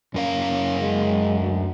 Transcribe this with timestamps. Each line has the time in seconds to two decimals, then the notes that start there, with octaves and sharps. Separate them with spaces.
0.14 F#2 C#4 A#4 F5
0.80 G#3
1.39 D2